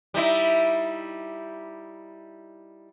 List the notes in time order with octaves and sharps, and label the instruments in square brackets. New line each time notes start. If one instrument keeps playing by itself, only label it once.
[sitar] G3 D#4 E4